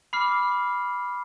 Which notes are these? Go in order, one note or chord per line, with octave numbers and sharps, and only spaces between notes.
B5 D6 F6 C7